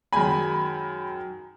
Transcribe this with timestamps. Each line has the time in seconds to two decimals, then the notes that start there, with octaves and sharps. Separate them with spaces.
0.12 F#2 D#3 G#3 G#5 B5